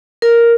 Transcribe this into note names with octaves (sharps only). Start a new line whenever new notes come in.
A#4